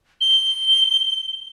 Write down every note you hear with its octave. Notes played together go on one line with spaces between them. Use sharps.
G7